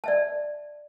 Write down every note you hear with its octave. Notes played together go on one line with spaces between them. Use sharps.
D5 E5 A5